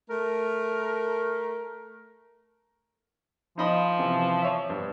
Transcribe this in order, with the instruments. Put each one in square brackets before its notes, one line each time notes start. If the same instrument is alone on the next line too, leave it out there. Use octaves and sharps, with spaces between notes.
[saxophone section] A3 A#4
[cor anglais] F3 [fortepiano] D#4 D#5 B5
[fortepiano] C3 E3
C#5 E5
G2